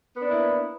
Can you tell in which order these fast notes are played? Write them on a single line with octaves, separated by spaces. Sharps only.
B3 D4 A#3 E4